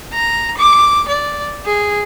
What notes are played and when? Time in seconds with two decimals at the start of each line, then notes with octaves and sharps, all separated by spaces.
0.13 A#5
0.58 D6
1.08 D5
1.65 G#4